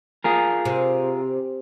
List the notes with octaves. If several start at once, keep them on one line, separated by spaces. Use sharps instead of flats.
F4 G#4 A#4
C3